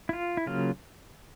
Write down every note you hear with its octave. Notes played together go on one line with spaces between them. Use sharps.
E4
F4
E4
C#3 F#3 A#3 F4